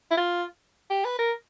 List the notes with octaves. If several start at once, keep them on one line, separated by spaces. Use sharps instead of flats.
E4
F4
G4
B4
A#4